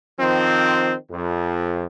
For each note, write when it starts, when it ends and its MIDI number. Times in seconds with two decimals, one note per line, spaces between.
0.19 0.94 51
0.19 0.94 53
0.19 0.94 60
1.11 1.84 41